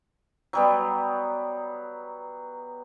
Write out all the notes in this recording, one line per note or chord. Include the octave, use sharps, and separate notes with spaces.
F#3 G3 B3